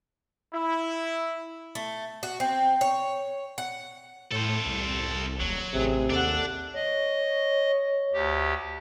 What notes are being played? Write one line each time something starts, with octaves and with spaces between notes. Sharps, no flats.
E4
A3
F#4
C4
C#5
F#5
A2 A4 C5
C2
D#1 F#3
A1 C3 G#4
D#2 D4 A4 F#5
C#5 D#5
D2 G4